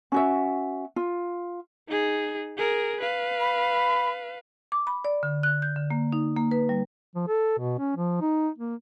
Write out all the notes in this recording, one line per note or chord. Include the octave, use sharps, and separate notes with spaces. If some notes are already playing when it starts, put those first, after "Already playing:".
C#4 F#4 E5
F4
D#4 G#4
G#4 A#4
B4 F5
B5
D6
B5
D5
D3
F#6
G6
D3
A#3
D#4
A#3
B4
G3
F3
A4
B2
C#4
F3
D#4
A#3